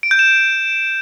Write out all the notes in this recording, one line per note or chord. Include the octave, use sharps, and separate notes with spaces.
D7
G6
E7